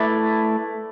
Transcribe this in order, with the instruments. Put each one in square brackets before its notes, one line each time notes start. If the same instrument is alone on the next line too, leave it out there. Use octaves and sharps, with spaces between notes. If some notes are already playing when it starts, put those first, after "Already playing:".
Already playing: [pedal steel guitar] A3 E4 B4 D5